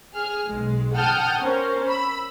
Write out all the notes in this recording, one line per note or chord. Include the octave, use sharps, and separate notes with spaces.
G#4 F6
B1 G#3
F#5 G5 A5 D#6 F6 G6
C#4 A#4 C5
B5 E6